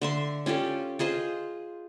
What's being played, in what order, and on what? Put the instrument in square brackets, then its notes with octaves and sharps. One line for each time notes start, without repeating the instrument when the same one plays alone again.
[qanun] D3 E5 C6
C#4 F4 G4 A4
F4 G#4 C5 D#5